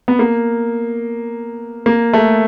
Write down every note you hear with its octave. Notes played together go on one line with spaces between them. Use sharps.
B3
A#3
A#3
A3